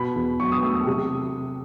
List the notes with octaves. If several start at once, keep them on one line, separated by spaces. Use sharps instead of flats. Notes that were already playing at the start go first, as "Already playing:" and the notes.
Already playing: B2 B5
E2
F#3 C#6
D#6
A3 E6
D#6
C3